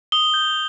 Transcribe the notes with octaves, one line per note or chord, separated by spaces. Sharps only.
D#6 G7
G6